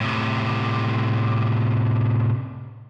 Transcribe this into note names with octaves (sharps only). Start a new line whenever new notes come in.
A2 C3